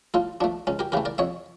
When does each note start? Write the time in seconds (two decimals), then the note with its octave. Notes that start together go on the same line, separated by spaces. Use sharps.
0.14 A2 F4 A4
0.41 F3 A3 D4
0.67 C#2 C#4
0.79 G4 A#4
0.92 C#3 E3 A3 G4 A#4
1.05 A#4 D5
1.18 F2 C#5 E5